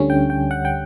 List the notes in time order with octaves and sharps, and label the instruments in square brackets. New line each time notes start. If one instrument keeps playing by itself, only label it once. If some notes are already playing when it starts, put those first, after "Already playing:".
Already playing: [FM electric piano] D2 D3 G3 C#4
G5
G5
F#5
G5